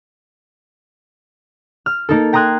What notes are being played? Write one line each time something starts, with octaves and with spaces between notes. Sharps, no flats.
F6
A#3 D#4 A4
G5 A#5 C6 D#6 F#6 G#6